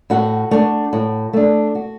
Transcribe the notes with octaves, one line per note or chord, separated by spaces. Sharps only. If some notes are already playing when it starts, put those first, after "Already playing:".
A2 F#4 F#5
A3 D4
A2
A3 D4
F#4